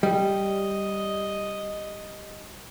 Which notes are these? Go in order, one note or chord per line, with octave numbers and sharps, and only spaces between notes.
G3 D#5